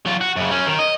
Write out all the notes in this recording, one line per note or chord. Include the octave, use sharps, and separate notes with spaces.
F#3 F4
F#4
F#2 C#3
F#3 C#4
D#3
D#5